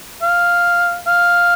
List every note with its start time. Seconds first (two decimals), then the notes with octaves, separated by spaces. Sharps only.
0.22 F5
1.07 F5